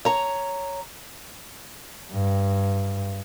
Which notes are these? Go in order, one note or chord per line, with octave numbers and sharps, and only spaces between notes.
C#5 A#5
G2